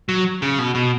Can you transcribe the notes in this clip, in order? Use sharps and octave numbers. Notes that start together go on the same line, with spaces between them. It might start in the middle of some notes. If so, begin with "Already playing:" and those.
F#3
C#3
B2
B2